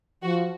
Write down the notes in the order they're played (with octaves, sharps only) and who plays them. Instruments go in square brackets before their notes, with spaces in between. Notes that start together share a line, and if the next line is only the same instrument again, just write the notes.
[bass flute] F3 [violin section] F#4